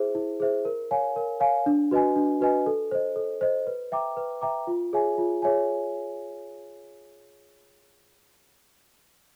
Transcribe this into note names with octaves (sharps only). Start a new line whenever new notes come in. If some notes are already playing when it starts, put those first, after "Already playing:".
Already playing: E4 G#4 C5 E5
E4
G#4 C5 E5
A#4
C#5 F5 G#5
A#4
C#5 F5 G#5
D4
F#4 B4 D#5 G#5
D4
F#4 B4 D#5 G#5
A4
C5 D#5
A4
C5 D#5
B4
E5 G5 A#5 D6
B4
E5 G5 A#5 D6
F4
G#4 C#5 E5 G#5
F4
G#4 C#5 E5 G#5